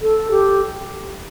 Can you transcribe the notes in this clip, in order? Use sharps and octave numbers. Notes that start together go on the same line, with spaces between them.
A4
G4